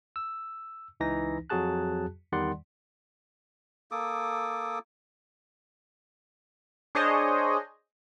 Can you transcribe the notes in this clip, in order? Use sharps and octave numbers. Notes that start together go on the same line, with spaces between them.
E6
C#2 E3 D#4 A#6
F2 F#3 F#4 G#4 A5 F#6
E2 D#3 G3 D5 F#5 C6
A#3 A4 D6 D#6
D4 G#4 C5 C#5 D#5